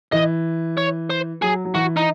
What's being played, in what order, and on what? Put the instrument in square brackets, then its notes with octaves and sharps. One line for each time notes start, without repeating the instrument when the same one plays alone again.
[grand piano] E3 [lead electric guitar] D#5
[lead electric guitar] C#5
C5
[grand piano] F#3 [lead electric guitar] G#4
[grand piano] F#3
[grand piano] E3 [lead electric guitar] F#4
[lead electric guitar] D#4